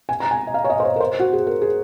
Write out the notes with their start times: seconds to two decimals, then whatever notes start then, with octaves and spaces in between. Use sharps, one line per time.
0.09 G#5
0.20 A#5
0.31 G#5
0.47 D#5
0.54 F5
0.64 C#5
0.70 D#5
0.80 C5
0.85 C#5
0.96 A#4
1.01 C5
1.20 F#4
1.33 G#4
1.47 A#4
1.62 G#4